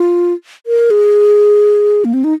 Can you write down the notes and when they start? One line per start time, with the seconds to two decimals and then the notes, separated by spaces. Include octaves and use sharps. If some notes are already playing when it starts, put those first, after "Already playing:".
Already playing: F4
0.66 A#4
0.91 G#4
2.05 A#3
2.14 C4
2.24 D#4